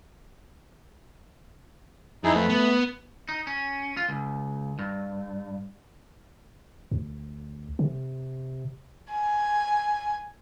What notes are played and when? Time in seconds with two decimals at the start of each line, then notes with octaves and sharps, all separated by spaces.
2.24 F2 D#4 E4 G#4
2.36 A3 B4
2.50 B3
3.29 D#4
3.47 C#4
3.97 F4
4.09 C#2
4.79 G2
6.91 D2
7.79 C3
9.12 G#5